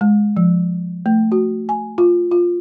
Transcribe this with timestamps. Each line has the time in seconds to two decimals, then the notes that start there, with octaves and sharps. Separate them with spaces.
0.01 G#3
0.37 F3
1.06 A3
1.32 F#4
1.69 G#5
1.98 F4
2.32 F4